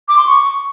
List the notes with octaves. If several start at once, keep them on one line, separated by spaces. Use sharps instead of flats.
D6
C6
C#6